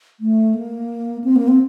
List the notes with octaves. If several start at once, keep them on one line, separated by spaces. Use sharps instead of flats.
A3
A#3
C4
A#3
C4